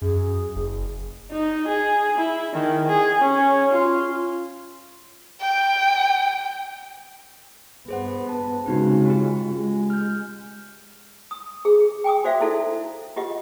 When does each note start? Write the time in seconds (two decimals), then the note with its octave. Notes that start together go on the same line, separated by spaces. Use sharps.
0.02 F#2 G#4
0.56 F#1
1.32 D#4
1.68 G#4
2.18 E4
2.53 D#3
2.87 G#4
3.21 C#4
3.72 F4
5.41 G5
7.88 G2 B3 G#4 C5 F#5
8.29 A5
8.66 C#3 G#3 C4 D#4 F#4
9.06 F4 G4
9.49 G#3
9.90 F6 G6
11.31 D#6
11.65 G#4
12.04 G5 G#5 D6 D#6
12.24 F#4 C5 D5 E5 F5
12.40 D#4 E4 A4
13.16 F4 G4 D#5 F#5